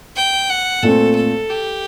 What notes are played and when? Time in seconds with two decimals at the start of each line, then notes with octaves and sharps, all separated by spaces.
0.16 G5
0.50 F#5
0.83 A#2 A3 C4 A4
1.16 A4
1.50 G4